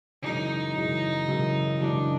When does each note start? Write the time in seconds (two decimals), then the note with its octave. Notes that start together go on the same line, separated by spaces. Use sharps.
0.22 F#2 C#3 E3 G#3 D#4
0.76 F#2 C#3 E3 G#3
1.28 F#2 C#3 E3 G#3
1.80 F#2 C#3 E3 G#3 D4